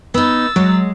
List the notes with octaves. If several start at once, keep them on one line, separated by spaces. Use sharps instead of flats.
B3 D#4 E6 A6
F#3 G#3